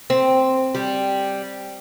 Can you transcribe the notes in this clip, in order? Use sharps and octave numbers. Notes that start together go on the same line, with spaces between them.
C4
G3